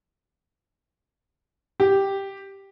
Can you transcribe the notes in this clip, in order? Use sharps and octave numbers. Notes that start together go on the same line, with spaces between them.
G4